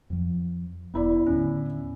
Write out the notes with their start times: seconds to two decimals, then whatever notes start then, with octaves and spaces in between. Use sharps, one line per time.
0.10 F2 F3
0.94 E1 B3 E4 D5
1.27 D#2 A2 D3 C#4